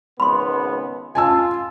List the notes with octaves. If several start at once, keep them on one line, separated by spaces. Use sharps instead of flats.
G#1 C#2 B3 B5 C6
F4 G#5 A5 E6